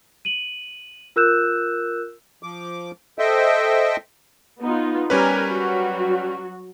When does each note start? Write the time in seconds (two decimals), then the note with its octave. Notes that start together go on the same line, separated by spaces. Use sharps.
0.25 D#7 F#7
1.16 F4 A#4 E6 F#6 G6 E7
2.43 F3 D6
3.19 A4 C5 D#5 E5 G5
4.61 B3 D#4 F4
5.10 G3 C#4 G4 A#4 B4 G#5
5.49 F#3 F#4